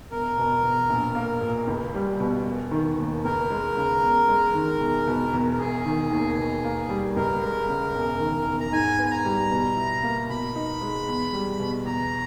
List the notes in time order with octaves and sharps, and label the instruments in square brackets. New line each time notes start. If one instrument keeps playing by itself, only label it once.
[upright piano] E1 [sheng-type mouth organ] A#4
[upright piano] B2
E2
A#1
A#3
A#2
C#2
G3
B2
E1
D#3
D#2
[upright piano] C#2 [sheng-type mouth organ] A#4
[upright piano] G#3
C#3
E2
G#3
D#3
E1
B2
E2
[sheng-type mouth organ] A#4
[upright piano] E1 [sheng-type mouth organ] G#4
[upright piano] D#3
D#2
B2
A#3
G3
[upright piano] C#2 [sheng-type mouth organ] A#4
[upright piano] G#3
C#3
E1
D#3
E2
[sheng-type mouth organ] A#5
[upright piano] G#2 [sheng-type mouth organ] G#5
[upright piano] B3
[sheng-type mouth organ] G#5
A#5
[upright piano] G3
B2
E4
A#3
[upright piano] B2 [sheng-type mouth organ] B5
[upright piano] D#4
G#3
E2
G3
B2
[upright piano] E2 [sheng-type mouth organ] A#5